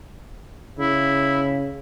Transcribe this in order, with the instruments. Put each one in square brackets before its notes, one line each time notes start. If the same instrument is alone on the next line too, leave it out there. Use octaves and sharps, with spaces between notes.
[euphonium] C#3 [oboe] E4